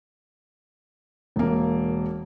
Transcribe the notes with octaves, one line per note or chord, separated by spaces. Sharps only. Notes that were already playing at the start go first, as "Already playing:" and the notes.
E1 A#3